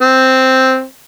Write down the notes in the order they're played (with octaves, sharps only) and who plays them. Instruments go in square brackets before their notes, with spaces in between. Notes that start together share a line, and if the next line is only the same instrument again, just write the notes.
[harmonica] C4